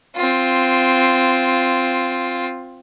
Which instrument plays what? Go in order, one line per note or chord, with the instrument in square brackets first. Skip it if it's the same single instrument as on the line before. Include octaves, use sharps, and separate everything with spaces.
[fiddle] C4 F4